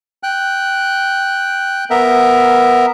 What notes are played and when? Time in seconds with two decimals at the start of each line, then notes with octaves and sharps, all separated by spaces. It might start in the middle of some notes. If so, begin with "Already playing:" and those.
0.23 G5 F#6
1.90 B3 A#4 E5